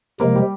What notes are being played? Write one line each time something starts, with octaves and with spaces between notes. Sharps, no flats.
C3 F3 G#3 A#3 A#4
G3 G4